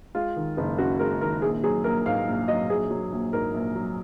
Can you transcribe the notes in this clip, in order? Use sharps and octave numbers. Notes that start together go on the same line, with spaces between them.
G#3 F4
D#3
F#1
F#2 F#4
G#3 A#4
D#3 A#4
A#1 G#4
F#3 G#4
A#1 A#4
G#2 F5
A#1
F#3 D#5
A#1 G#4
F#3
A#1
G#2 A#4
A#1
F#3